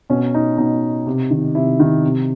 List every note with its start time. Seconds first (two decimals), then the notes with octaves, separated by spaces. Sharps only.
0.10 B2 C#4
0.34 D#4
0.58 B2 D#4
1.06 C3
1.31 D#3
1.55 C3 E4
1.80 D#3
2.03 C3